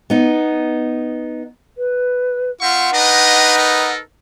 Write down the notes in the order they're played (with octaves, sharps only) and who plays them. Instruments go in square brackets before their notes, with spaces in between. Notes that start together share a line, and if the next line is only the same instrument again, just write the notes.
[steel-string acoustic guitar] B3 D#4
[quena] B4
[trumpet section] C4 E5 C#6 [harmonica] F4 [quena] F#5
[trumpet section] D4 D#5 [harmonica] D#4 B4
[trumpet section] A4 A#4